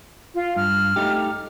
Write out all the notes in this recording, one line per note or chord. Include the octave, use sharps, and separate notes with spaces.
F4
G2 F6
A3 D#4 G4